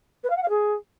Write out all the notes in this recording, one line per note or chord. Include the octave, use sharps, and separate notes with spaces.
B4
F5
F#5
F5
G#4